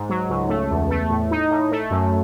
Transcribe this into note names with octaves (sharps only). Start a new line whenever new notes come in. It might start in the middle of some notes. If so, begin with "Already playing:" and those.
Already playing: G#2
F#3
C#2
A3
E2
A3
A2
D#4
A2
A3
F#2